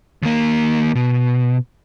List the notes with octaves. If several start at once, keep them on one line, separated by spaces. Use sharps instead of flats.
D#2 A#3
B2